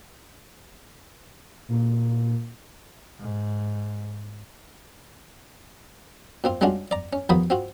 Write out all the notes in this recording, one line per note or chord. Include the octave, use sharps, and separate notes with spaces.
A#2
G#2
A#2 C4 F4
G3 G#3 C#4 D4 F4 F#4
D5 A#5
C#4
D#2 F3 A#3 B3 B5 D#6
C4 F4 F#4